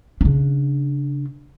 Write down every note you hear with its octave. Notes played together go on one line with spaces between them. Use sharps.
C#3 D4